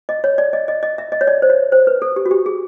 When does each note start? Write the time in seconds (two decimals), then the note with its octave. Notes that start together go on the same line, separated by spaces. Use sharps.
0.09 D#5
0.24 C#5
0.38 D5
0.53 D#5
0.68 D#5
0.83 D#5
0.98 E5
1.12 D#5
1.21 C#5
1.27 D5
1.42 C5
1.50 C#5
1.72 C5
1.87 B4
2.02 A4
2.16 G4
2.26 F#4
2.31 G4
2.46 G#4